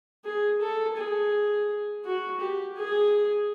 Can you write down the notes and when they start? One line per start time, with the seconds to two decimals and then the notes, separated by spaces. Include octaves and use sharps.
0.24 G#4
0.61 A4
0.97 G#4
2.04 F#4
2.40 G4
2.76 G#4